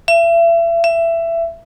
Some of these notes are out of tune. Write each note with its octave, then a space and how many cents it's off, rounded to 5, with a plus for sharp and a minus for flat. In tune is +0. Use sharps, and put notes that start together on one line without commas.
E5 +35
E5 +20